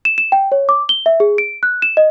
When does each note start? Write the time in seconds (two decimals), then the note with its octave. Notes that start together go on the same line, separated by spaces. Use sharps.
0.05 E7
0.18 E7
0.32 G5
0.52 C#5
0.69 D6
0.89 G7
1.06 E5
1.20 G#4
1.38 D7
1.63 F#6
1.82 E7
1.97 D#5